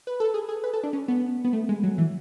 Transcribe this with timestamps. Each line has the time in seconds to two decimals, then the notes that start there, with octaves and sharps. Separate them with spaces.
0.07 B4
0.20 A4
0.34 G#4
0.49 G#4
0.64 B4
0.73 A4
0.83 D4
0.93 C#4
1.08 B3
1.45 B3
1.53 A3
1.69 G#3
1.83 F#3
1.98 E3